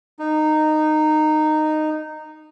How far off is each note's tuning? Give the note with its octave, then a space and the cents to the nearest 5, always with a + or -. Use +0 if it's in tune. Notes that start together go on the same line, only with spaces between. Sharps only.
D#4 -15